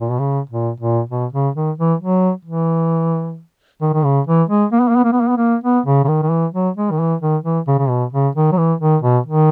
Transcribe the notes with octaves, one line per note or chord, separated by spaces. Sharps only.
A#2
B2
C#3
A#2
A#2
B2
C#3
D#3
E3
F#3
E3
D#3
D#3
C#3
E3
G#3
A#3
B3
A#3
B3
A#3
B3
A#3
B3
A#3
B3
C#3
C#3
D#3
D#3
E3
F#3
G#3
D#3
E3
D#3
E3
C#3
C#3
B2
C#3
D#3
F#3
E3
D#3
B2
D#3